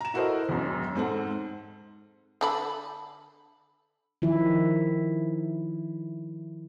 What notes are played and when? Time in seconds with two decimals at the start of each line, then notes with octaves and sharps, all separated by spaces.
0.01 A#5 E7
0.14 E4 F#4 A4 A#4 C5 D#5
0.49 E1 F#2
0.96 G#2 C4 A4 F#5
2.41 D3 A4 B5
4.22 D#3 F3 E4